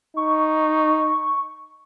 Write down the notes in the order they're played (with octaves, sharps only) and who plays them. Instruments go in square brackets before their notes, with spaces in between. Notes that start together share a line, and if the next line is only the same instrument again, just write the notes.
[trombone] D#4 [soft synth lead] C#6